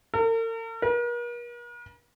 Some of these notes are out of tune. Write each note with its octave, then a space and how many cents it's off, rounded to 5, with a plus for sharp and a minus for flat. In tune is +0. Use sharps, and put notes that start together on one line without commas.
A#4 -45
A#4 +45